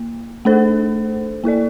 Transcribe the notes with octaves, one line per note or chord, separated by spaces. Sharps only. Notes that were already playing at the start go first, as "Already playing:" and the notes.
Already playing: A#3
A3 D4 A4 C5
A#3 E4 A4 D5